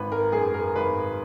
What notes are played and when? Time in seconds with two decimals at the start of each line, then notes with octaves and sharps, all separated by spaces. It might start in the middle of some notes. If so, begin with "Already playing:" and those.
Already playing: G#1 B4
0.12 A#4
0.32 F#2 G#4
0.54 A#4
0.75 G#1 B4